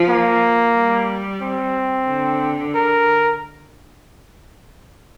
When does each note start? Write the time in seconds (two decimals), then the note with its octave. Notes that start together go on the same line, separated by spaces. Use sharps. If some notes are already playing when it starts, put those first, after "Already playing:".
Already playing: F3
0.09 A#3
0.76 G3
1.42 C4
2.08 D3
2.75 A#4